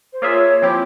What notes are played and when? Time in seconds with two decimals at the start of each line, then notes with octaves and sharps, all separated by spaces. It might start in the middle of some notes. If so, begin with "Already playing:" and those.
0.13 C5
0.22 A#3 F4 G#4 C#5 E5
0.62 F3 C4 E4 G4